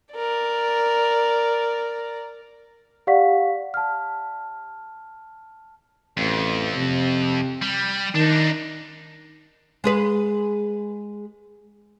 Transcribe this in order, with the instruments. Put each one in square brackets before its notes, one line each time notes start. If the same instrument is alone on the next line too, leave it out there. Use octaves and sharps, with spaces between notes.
[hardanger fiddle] A#4 D5
[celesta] G4 D5 F5 F#5 C#6 B6
A5 F6
[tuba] A1 [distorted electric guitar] F2
[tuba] C3
[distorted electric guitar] G3
[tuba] D#3 [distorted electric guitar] D4 D#4
[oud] G#3 G#4 B4